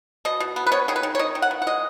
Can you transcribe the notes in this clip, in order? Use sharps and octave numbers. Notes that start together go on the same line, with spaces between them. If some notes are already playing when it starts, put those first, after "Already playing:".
B2 D#5
B2
B3
B4
B3 C#5
D#3 G#4
B4
D#3
C#5
D#3 D#5
D#3
F#5
B3
F#5
G#3 D#5